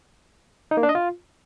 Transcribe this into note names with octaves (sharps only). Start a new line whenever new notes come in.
D#4
A#3
D4
D#5
F4